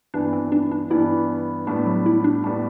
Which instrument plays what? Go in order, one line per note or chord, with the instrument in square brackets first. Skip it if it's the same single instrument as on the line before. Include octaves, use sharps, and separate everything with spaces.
[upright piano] G2 E3 B3 [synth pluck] D4
[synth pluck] C4
D4
D4
[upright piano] G2 E3 B3 [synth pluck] E4
[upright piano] A2 G3 B3 [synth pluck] D4
[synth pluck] F#3
E4
D4
[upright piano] A2 G3 B3 [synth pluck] D4